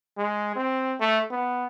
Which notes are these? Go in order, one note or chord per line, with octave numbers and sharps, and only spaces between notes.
G#3
C4
A3
B3